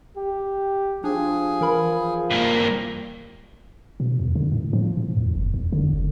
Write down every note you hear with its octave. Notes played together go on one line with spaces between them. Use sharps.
G4
F3 D4 G#4
E3 A#4 B5
G2 A#3
B2
E2
D3
A2
F3
A2
E2
F#1
E2
D3
F#1